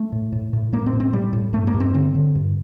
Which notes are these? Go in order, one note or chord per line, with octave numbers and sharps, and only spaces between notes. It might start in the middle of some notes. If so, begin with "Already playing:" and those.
Already playing: A3
A2
A2
A2
A2 A#3
C4
A2
C4
A2 G3
A2
G2 A3
A#3
G2
C4
D3 C4
D3
G2